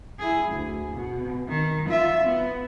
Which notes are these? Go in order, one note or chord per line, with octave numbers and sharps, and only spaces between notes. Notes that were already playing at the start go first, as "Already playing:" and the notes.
E4 G#4
D2
B2
D#3
F4 E5
B3